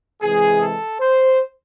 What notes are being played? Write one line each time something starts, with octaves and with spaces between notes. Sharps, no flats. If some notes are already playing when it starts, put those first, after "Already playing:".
C3 E3 G#3 G#4
A4
C5